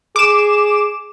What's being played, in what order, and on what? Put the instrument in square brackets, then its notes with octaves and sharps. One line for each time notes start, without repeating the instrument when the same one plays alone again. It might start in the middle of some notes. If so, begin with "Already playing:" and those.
[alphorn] G#4 [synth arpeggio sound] D6 E7